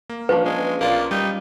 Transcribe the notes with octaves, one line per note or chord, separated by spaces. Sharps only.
A#3
F3 C#4 D4 B4
G#3
B1 A#3 F4 D5
G3 D#4